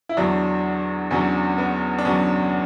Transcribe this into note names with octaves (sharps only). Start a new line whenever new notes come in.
E4
E2 D3 F#3 D4
E2 D3 F#3 C#4
B3
D4
E2 D3 F#3 C#4